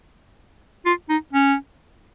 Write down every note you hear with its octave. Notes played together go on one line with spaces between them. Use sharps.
F4
D#4
C#4